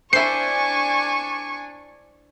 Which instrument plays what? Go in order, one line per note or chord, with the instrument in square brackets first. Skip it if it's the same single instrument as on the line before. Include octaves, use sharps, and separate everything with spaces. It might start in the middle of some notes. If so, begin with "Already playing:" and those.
[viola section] D4 G#5 [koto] E4 C5 [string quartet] C#6 [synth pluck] C7